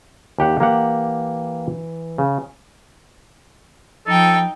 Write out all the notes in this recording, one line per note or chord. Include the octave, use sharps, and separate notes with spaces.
D#2 G4 F#5
E3 A#3 G4 F#5
C#3
F3 D#4 A4 G5